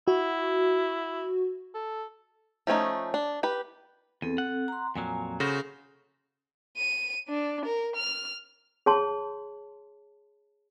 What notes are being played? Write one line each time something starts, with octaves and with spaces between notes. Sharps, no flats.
E4 F#4
A4
F3 A3 C#4 D#4
D4
G4 B4
E2 C4 A4
F#5
A#5 C6
F2 A#2 F#3 G#5 A#5
C#3 F#4 A4 C5 A#6
D#7
D4
A#4
F6
G#4 C#5 A5 C6